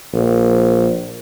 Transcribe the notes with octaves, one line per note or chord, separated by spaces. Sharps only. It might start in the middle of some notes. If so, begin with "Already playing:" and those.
A#1